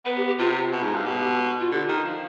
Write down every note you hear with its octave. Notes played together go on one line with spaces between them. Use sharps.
B3 B4
G4
G4
C3 F4
B2
G#2
G2
B2 G4
F4
D3 G4
D#3
F3